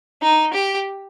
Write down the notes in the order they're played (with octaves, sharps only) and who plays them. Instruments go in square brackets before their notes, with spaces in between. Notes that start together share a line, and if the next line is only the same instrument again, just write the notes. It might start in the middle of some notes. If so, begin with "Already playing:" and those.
[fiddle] D#4
G4